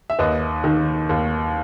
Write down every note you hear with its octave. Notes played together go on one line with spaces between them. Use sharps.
E5
D#2 B4 D#5
D#3
D#2